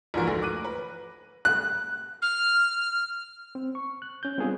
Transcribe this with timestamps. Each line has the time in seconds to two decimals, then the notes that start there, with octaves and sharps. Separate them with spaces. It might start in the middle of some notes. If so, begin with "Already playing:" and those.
0.14 A#1 G#2 E3 F#4 A#4
0.27 D2 G#2 A3 A#6
0.42 D6 F#6 D#7
0.64 B4
1.45 F#6
2.22 F6
3.55 C4
3.75 C#6
4.02 F#6
4.23 C#4 G6
4.38 G3 B3 C4 D4 F4 G#4